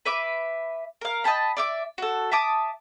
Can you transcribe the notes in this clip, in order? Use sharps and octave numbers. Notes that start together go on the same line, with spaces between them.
B4 E5 D6
A#4 F5
D#5 G5 A5 B5
D5 E5 D6
F#4 A4
E5 A5 D6 D#6